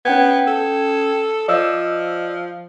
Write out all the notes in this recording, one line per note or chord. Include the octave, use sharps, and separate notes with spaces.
B3 C#4 G5 G#6
A4
F3 D5 D#5 E6